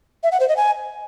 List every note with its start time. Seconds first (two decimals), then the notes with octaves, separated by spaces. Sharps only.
0.23 E5
0.32 F#5
0.40 C5
0.48 D#5
0.57 G#5